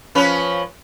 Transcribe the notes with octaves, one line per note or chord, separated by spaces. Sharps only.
F3 C#4 B4